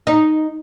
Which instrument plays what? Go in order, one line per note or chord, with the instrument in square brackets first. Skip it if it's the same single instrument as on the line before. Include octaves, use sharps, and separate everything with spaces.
[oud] D#4